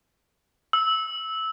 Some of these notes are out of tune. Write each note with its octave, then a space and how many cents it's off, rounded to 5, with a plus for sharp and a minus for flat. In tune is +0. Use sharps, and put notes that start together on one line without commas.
E6 -15